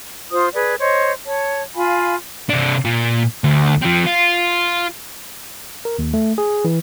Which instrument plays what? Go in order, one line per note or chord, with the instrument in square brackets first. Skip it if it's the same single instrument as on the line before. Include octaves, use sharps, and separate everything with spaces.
[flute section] F4 C5 D#6
G#4 B4 D5
C5 C#5 D#5
C#5 A5
F4 F5 G#5 B5
[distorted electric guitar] C3 D4
A#2
D2
F3 C4
F4
[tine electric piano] A#4
D#2
A3
G#4
E3